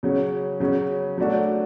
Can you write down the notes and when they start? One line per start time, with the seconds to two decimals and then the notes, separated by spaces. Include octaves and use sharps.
0.03 C#3 F#3 C#4
0.60 C#3 F#3 C#4
1.18 F#3 A3 D4 F#4